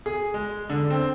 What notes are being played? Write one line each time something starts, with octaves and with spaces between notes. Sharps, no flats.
G#4
G#3
D3
C4